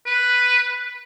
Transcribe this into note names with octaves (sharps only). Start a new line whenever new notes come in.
B4